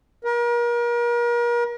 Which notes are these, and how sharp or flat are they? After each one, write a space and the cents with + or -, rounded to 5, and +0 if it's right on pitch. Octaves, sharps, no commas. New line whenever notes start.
A#4 +35